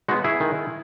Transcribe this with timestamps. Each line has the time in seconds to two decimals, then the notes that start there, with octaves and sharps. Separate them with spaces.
0.08 G#3 D#4 F#4
0.11 B3
0.24 E4 G#4
0.40 D#3